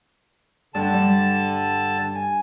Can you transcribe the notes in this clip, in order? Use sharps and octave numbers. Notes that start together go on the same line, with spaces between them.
G2 D3 A5
G3
G#5